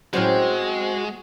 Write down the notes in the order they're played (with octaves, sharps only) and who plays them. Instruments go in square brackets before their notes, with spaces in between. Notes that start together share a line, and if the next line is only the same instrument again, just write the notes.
[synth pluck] A2 F#3 C#4 [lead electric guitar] G#3 [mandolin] C4 C5 F6 [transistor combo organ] F#4